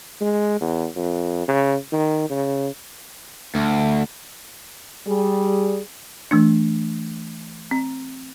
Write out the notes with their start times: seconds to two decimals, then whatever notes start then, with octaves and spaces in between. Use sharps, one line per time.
0.21 G#3
0.61 E2
0.96 F2
1.48 C#3
1.92 D#3
2.30 C#3
3.55 D2
5.08 G3 G#4
6.31 E3 A3 D4
7.71 C4